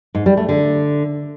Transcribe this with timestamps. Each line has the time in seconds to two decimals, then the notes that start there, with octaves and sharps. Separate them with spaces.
0.15 G#2
0.26 G3
0.37 A3
0.49 D3